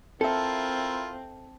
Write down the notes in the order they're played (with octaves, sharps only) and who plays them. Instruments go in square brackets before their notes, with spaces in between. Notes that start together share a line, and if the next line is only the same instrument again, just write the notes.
[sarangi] C4 [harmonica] E4 F4 A#4 [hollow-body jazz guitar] A4 E5 [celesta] A5